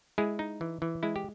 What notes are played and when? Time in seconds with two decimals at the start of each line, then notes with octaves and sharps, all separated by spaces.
0.18 G#3 E4 G#4
0.39 D#4
0.61 E3
0.82 E3
1.03 G#3 E4
1.16 G4